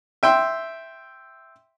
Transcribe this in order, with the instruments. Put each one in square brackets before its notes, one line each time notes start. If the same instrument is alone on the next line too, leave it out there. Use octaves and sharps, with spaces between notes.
[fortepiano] E5 G5 C6